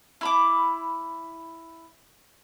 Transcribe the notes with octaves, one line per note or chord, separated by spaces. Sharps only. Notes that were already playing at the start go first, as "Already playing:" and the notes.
E4 B5 D6